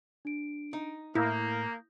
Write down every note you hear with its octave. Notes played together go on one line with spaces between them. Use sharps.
D4 D7
D#4
A2 A#3 E4 D#6 G6 A#6